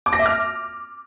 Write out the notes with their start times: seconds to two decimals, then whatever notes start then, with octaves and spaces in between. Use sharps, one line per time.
0.06 D6
0.13 A#6
0.19 E5
0.26 F6